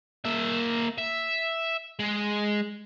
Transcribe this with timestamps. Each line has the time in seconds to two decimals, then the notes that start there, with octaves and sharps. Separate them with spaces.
0.25 A#3 E5
0.98 E5
1.99 G#3